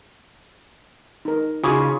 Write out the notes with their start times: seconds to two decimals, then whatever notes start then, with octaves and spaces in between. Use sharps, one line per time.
1.25 D#4 A#4
1.64 C#3 D#4 F4 F#4 G#4 C#5 G#5 D#6
1.80 F4